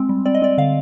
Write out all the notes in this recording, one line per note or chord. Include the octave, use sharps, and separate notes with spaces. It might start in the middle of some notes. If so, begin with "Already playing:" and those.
Already playing: G#3 C4
G3
C4 D5
D#5
C4 D5
D3 F5